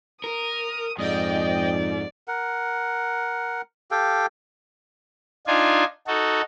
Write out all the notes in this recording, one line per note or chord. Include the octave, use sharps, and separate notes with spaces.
A#4 D#6
F2 G#2 D5 D#5 G5
A#4 F#5
G4 A4 F5 G5
D4 D#4 F4 G#5
D#4 F#4 A4